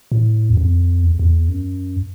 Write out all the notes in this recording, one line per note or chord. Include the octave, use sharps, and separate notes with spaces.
A2
E2
F2
E2
E2
F#2